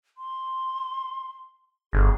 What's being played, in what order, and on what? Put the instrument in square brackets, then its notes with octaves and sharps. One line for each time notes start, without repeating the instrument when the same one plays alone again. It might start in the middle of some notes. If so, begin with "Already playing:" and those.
[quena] C6
[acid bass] G1 [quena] G#4